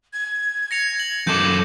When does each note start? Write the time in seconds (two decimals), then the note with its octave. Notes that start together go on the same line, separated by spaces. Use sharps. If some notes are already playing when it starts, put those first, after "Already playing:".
0.13 G#6
0.71 A#6 C#7 F7
1.00 F#7
1.27 F#2 A4 D6 G6